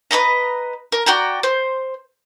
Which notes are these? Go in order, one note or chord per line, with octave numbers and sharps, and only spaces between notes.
B4 C#5 D#5 A#5
A#4
F#4 D5 G5 A#5
C5